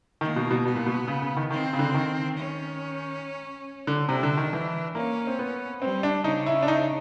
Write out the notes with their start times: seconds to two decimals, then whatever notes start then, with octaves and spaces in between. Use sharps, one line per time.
0.21 D#3 A#3
0.36 B2
0.51 B2
0.65 B2 B3
0.75 A#2
0.86 B2
1.08 C#3
1.22 C#3
1.37 D#3
1.50 D#3 C4
1.73 C#3
1.79 D3
1.94 D#3
2.37 C#4
3.87 D3
4.09 C3 D4
4.23 D3
4.37 D#3
4.53 E3
4.95 A#3 C#4
5.27 C4
5.39 B3
5.82 G3 C4
6.03 D4
6.24 C#3 D#4
6.46 E4
6.62 D4
6.68 D#4